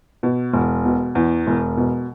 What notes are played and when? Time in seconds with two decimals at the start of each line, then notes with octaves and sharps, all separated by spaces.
0.23 B2
0.54 E1
0.85 B2
1.15 E2
1.47 E1
1.77 B2